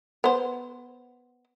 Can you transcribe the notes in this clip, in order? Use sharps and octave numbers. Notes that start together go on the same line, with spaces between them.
B3 C5